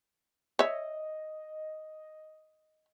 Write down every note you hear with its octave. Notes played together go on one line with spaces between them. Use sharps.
C#5 D#5 E5